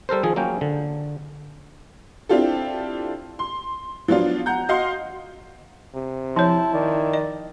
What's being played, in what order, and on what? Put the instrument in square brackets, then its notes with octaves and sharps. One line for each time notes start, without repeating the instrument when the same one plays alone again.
[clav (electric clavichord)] G3 A4 A#4 C5
D#3 F3 G#4
F#3 A#3 C#4 G5
D3
[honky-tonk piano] C4 D4 E4 F4 G4 A4
C6
F3 F#3 B3 D4 F4
F#5 A#5 G6
F#4 D#5 F5 F#5 C6
[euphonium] C3
[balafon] F3 C#5 [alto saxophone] E4 [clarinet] A5
[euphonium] D#3 [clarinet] D5
[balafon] D#5